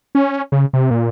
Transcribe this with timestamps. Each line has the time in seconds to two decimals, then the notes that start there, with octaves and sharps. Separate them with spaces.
0.15 C#4
0.52 C#3
0.73 C3
0.91 A#2